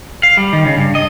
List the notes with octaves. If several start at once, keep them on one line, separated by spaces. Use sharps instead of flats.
F5
G3
D#3
C#3
G2
D#5